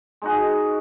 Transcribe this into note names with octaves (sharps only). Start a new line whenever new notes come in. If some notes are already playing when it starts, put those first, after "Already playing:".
G#3 D#4 F#4